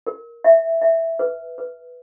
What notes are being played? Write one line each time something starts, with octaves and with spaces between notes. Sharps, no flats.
A#4
E5
E5
B4
B4